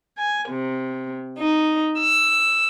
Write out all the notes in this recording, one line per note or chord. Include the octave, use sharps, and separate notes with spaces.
G#5
C3
D#4
E6